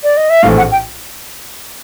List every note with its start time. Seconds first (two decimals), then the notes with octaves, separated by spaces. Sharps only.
0.03 D5
0.17 D#5
0.30 E5
0.43 A#1 A2 E3 A3 C4 F5
0.57 F#5
0.72 G5